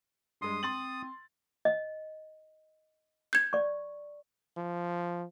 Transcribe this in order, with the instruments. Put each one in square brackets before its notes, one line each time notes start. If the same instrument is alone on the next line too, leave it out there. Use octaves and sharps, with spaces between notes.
[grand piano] G2 G#3 [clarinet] C6 [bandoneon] D#6
[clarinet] C4 [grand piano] C6 A6 F#7
[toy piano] D#5
[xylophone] G6 G#6
[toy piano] D5 C#6
[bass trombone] F3